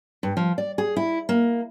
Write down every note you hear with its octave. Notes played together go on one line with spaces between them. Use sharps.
G2
F3
D5
G#4
E4
A#3